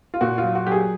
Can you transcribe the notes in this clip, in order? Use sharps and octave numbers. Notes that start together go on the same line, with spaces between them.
F4
A#2 F#4
F4
F#3
F#4
F#3 G4
G#4